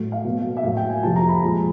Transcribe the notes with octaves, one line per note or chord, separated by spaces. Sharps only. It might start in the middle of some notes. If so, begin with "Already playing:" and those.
Already playing: A2 F#3 A3
F5
B2 F#3 A#3
E5
A2 F#3 A#3 F5
G5
G#5
F2 C3 F3 A5
A#5
B5
A#2 F3 G#3